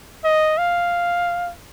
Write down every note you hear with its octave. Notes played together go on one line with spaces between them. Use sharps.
D#5
F5